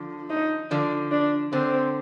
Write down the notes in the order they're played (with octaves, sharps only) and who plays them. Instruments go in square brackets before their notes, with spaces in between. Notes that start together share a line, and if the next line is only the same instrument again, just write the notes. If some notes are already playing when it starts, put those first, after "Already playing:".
Already playing: [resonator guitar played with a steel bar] D3 F3
[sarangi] D#4
[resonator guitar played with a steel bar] D3 F3 [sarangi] D4
[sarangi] D4
[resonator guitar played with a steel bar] D3 [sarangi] C4